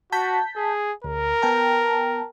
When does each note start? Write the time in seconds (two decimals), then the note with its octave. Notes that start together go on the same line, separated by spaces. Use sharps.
0.12 F#4 A5 G6 B6
0.56 G#4
1.04 D2 A#4
1.42 B3 G5 A5